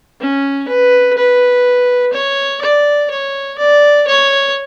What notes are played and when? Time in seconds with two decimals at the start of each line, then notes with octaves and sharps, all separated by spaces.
0.21 C#4
0.68 B4
1.18 B4
2.13 C#5
2.61 D5
3.10 C#5
3.58 D5
4.07 C#5